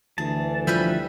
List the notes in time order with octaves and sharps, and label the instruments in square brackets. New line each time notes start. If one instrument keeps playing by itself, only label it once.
[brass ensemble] D2 E3 [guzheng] G#4 [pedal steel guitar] A5
[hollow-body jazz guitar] F3 [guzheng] G3 B4 G#5 [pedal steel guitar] E5